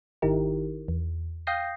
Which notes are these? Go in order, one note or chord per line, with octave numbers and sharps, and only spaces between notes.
G#1 D#3 D#4 E4 G4 A#4
E2
F5 G5 D#6 G6 A#6 C7